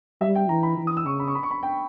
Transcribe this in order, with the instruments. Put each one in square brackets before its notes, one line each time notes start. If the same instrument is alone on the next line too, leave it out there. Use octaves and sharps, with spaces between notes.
[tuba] G3 [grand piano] E5
[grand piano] G5
[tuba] E3 [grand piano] A#5
[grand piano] B5
[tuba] E3
[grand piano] D#6
E6
[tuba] C#3 [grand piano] C#6
[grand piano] B5
C#6
B5
C#6
B5
G5